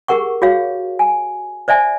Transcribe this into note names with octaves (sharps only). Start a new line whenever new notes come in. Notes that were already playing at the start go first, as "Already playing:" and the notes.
G4 G#4 A#4 F#5 C#6
F#4 G#4 C#5 F5
G#5
C5 D5 E5 G#5